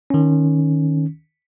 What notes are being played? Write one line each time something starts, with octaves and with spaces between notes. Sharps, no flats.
D#3 C#4